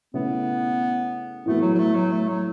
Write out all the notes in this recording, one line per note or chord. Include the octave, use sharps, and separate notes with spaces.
C#3 A3 B3 E4 B4
A2 E3 A3 B3 F#4 A4
F#3
F#3
A3
F#3
A3
F#3